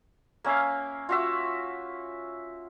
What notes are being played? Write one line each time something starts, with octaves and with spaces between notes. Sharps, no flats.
A#3 C#4 E5 F5
F4 F#4 E5